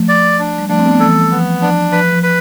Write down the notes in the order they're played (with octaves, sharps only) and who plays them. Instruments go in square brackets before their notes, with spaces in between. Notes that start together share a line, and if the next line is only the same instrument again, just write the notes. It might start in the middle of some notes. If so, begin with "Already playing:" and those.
Already playing: [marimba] F3 A3
[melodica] D5
D4
[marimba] G3
[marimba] F3 A3 [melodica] D4
[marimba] C4
B3
A3
[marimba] E3 G3 [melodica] A4
[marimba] F3 [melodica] B3
[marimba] F3 [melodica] D4
[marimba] F3 [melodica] B4
[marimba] F3
[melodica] B4